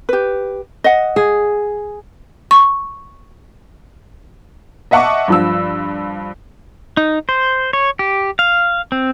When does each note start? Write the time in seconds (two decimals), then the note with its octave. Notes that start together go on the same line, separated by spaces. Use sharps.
0.09 G4 B4
0.84 D#5 F#5
1.16 G#4
2.51 C#6
4.91 D#5 E5 F#5 A5 C#6 D6
5.28 G2 F3 E6
6.97 D#4
7.29 C5
7.73 C#5
7.99 G4
8.39 F5
8.92 C4